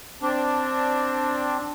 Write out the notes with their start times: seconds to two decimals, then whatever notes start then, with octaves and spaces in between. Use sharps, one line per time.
0.22 C4 D4